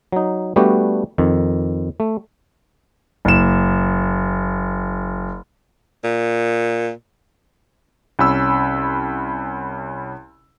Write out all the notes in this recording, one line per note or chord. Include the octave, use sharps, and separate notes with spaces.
F#3 D#4
G3 A3 B3 D4 F#4 G4
F2 D#3
A3
F#1 E7
A#2
C2 C#4 B5 E6